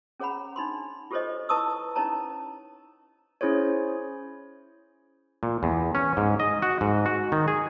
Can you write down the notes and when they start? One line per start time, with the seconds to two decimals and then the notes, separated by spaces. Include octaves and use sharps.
0.20 C#4 G#4 C#5 F#5 A#5 B5
0.56 D4 D#4 B5 C6
1.11 F4 G4 A4 C5 C#5 D#5
1.49 E4 B4 A5 C#6 D#6 E6
1.95 C#4 D#4 E4 C#5 A5 A#5
3.41 C#4 E4 G#4 C5 C#5
5.43 A#2
5.63 E2
5.95 C#4
6.17 G#2
6.40 D#5
6.62 F#4
6.81 G#2
7.06 F#4
7.32 D#3
7.48 G#4